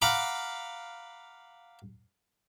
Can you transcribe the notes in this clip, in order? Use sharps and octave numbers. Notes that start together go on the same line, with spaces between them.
F5 F#5 A#5 B5 D6